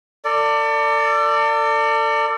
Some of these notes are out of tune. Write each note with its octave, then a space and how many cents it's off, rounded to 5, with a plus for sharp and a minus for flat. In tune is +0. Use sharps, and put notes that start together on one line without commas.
A4 +40 D5 +0